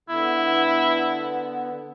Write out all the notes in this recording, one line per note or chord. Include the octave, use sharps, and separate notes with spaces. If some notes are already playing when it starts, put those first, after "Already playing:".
D3 B3 E4